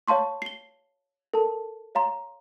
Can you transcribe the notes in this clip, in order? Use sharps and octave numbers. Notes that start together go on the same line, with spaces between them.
C#5 F5 A5 C6 C#6
C7 G7
A4 A#4 A5
C#5 F5 A#5 C6